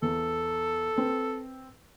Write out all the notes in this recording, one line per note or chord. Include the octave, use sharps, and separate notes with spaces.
E2 A4
C4 B4